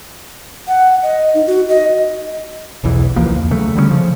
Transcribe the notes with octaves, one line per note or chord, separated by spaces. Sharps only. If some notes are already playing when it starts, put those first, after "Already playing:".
F#5
D#5
D#4
F#4
D#5
E1 B1 E2 E3
C#2 E3 F3 A#3
D#1 E2
C#3 F#3 A3
D3 G3 G#3 C#4
C#3 F3